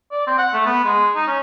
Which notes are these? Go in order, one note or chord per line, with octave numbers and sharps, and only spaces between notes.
D5
C4
F#5
A3
B3
G#3
D#4
C#4